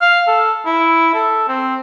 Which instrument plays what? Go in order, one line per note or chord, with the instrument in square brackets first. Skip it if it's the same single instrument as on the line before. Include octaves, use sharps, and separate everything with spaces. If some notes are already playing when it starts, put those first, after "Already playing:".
[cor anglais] F5
A4
E4
A4
C4